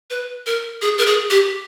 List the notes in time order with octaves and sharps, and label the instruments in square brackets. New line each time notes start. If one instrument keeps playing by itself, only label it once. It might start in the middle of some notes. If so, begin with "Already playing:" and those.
[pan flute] B4
A#4
G#4
A#4
G#4
G4